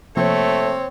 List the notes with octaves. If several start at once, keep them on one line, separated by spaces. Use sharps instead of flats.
C3 F3 A3 A#3 C4 C#5